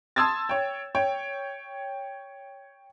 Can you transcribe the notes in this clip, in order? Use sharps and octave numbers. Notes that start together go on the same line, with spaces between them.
A5 C6 D#6 E6 G#6 A6
C#5 G5
C#5 G5